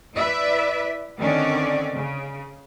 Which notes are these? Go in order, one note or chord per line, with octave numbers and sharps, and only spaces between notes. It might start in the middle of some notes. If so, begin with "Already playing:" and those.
E4 B4 D5 E5
D3 D#3 C4 C#4 D5
C#3